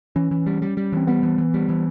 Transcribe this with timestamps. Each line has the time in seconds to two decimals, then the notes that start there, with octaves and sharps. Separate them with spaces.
0.16 E3 C#4
0.31 E3
0.46 G3
0.62 G3
0.77 G3
0.92 E3 C4
1.07 G3 B3
1.23 E3
1.38 E3
1.54 G3
1.69 E3